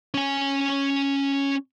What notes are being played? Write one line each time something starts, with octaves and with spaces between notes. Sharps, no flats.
C#4 G#5